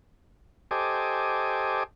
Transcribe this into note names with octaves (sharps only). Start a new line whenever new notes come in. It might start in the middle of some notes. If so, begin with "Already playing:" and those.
G4 A4 C5 D#5 G#5 D6